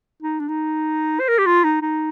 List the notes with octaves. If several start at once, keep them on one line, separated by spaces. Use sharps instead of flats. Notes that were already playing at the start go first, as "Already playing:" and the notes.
D#4
D4
D#4
C5
A#4
G4
F4
D#4
D#4